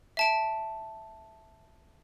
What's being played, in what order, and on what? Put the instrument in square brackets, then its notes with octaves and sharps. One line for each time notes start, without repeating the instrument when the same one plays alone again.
[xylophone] E5 A5 D7